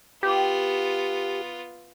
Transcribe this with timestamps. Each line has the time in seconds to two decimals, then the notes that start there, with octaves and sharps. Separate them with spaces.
0.23 B3 F4 G4